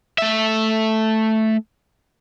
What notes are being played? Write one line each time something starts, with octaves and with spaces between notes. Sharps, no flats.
A3 E5